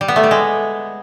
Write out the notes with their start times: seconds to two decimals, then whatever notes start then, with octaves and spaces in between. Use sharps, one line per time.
0.01 G3
0.08 B3
0.16 A3
0.23 G3
0.31 G#3